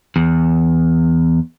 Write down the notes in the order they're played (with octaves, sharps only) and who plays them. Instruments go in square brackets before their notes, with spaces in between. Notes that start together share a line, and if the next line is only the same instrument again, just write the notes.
[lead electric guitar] E2